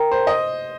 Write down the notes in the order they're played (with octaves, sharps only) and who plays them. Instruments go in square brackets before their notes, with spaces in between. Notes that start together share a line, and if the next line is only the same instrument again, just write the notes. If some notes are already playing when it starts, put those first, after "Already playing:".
Already playing: [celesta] A#4 G5 A#5
[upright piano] C5
D#5